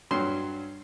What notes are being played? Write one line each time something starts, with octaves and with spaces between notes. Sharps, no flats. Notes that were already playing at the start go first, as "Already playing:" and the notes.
G2 F#3 C6